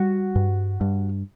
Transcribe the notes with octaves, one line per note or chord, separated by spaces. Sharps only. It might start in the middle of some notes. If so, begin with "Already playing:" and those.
Already playing: G3 F#4
G2
G2